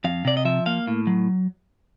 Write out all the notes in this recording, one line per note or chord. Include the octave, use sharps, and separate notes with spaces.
F2 F5
C3 D5
D#5
F3 E5
A#3 F5
A2
F#3